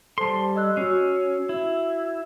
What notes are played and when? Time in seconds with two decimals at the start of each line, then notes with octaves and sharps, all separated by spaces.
0.18 G3 A4 C5 A5 C6
0.56 D#5 E6 F#6
0.77 C#4 F#4 E6 C7
1.49 E4